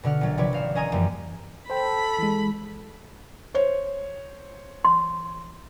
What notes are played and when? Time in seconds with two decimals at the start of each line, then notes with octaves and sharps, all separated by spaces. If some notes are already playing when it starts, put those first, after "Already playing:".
0.03 B2 D3 F#5 F6
0.21 A#1 F#3 A6
0.38 C3 F3 B4 C#5 D5
0.53 G#1 F5 E7
0.75 C#4 D#5 G#5 A#5 D#6 D#7
0.92 F#2 E3 F3 G3 A#3
1.70 A4 C5 G5 B5
2.19 E3 G#3
3.54 C5 C#5
4.85 C6